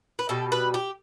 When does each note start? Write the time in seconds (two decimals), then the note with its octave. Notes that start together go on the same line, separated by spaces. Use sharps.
0.19 B4
0.29 B2 G3 A4
0.52 B4
0.74 G4